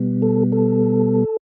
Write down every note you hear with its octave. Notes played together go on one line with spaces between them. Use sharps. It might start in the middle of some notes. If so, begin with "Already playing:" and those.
Already playing: B2 G3 B3
A4
A4